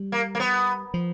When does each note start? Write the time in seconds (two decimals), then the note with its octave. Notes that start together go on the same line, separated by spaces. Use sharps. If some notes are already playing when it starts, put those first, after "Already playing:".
Already playing: G3
0.12 A#3
0.35 A#3
0.40 B3
0.94 F3